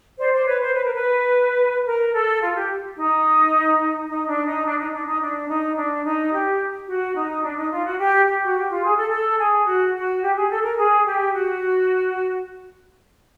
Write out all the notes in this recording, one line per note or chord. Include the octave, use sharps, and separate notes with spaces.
C5 D5
C5 D5
B4 C#5
C5
B4
A#4
B4
A#4
A4
F4
G4
D#4
D#4
D4
D#4
D4
D#4
D4
D#4
D4
D#4
D4
D#4
G4
F#4
D#4
D4
D#4
F4
F#4
G4
G4
F#4
G4
F4
G#4
A4
A4
G#4
F#4
F#4
G4
G#4
A4
A#4
G#4
G4
F#4